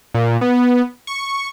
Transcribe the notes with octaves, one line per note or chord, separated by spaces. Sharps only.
A#2
B3
C#6